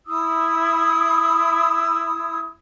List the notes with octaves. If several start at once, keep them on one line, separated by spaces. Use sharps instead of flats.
E4 D#6 E6